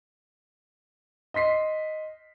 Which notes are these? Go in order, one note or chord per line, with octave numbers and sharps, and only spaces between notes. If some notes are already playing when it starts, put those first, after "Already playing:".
D#5 C6 B6 C7